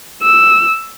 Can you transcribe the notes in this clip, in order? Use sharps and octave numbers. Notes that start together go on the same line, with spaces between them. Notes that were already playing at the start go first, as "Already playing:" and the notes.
E6